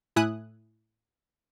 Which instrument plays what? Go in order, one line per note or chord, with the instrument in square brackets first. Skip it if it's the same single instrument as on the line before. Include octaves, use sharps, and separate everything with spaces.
[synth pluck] A2 E4 E5 G#5 D#6 F#6